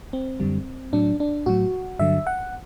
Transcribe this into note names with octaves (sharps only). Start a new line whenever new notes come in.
C4
F#2 D3 G3
A2 F#3 D4
D4
A2 F#3 F#4
G2 D3 F#3 E5
F#5